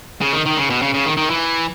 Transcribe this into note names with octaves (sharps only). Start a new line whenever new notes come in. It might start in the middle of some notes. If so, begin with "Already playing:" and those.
C#3
D#3
D#3
C#3
B2
C#3
C#3
D#3
D#3
E3